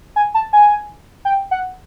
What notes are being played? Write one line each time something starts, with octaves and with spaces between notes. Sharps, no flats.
G#5
A5
G#5
G5
F#5